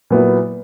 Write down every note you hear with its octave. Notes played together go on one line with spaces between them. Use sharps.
A#2 F#3 B3 E4